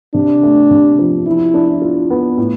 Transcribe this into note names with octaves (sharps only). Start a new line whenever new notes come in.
C3 D4
A3
C3
F3
F3 E4
D4
F4
B3
A2